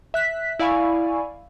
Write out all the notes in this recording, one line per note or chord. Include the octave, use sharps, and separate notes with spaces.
E5 F#6 B6
E4 D5 F5 G#5 B5 C#6